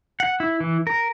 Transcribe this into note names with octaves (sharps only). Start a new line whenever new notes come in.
F#5
E4
E3
A#4